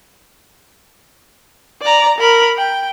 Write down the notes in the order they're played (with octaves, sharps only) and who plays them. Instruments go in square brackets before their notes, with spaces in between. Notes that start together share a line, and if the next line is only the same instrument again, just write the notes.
[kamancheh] D5 A#5
A#4 B5
G5